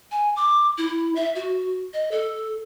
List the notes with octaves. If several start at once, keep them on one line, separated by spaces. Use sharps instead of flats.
G#5
D6
E4
E5
F#4
D#5
A4